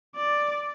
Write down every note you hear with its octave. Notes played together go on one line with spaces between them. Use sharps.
D5